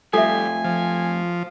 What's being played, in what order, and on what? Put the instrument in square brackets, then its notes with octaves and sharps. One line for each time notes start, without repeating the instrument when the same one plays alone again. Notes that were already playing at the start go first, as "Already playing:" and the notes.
[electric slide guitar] F2 A3 F4 [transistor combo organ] G3 [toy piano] A4 E5 [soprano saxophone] G#5
[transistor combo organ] F3